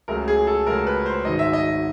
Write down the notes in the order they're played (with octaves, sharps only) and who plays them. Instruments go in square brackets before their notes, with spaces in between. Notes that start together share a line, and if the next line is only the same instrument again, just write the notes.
[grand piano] C#2 C#3 F#3 A3 A#4
G#4
A4
C#2 C#3 F#3 A3 A#4
B4
C5
G#1 G#2 D#3 F#3 D#5
E5
D#5